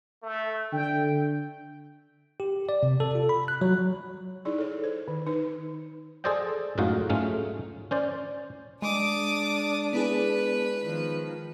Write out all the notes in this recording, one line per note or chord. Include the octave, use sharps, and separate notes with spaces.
A3
D3 G5
G4
D5
C3
A4
F4
B5
F#6
F#3
D#4 E4 G#4 D5
A4 C#5
C5
D#3
D#4 B4
G#4 A4 C5 D5 D#5 G5
F#2 A2 G#3 D#4 F4 F#4
G#2 F#3 G#3 A3 C#4 F4
C#4 C5 D5
G#3 D4 D6 D#6
B3 E4 G#4 B4
D#3 F3